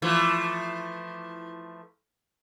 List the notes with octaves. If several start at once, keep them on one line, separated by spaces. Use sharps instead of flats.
E3 F3 A3